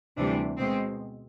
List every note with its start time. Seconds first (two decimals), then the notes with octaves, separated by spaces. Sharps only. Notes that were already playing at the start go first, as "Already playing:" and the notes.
0.16 D2 C3 E3 G3 D4
0.58 B2 G#3 C4